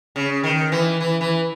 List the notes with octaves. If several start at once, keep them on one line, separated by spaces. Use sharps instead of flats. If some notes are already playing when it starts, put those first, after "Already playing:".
C#3
D#3
E3
E3
E3